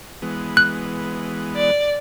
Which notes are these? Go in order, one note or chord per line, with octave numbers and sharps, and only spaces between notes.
E3 G#3 B3
F#6
D5